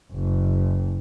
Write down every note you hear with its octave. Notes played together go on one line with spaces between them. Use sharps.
F#1